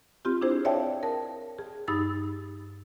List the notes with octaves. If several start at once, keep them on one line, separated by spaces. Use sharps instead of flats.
C4 F4 G4
D4 E4 G#4 C5
C#5 D5 E5 F5 G5 A5
A#4 A5
G#4
G2 D#4 E6 A6